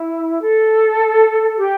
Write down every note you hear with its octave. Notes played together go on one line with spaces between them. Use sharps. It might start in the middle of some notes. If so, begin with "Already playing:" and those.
Already playing: E4
A4
G4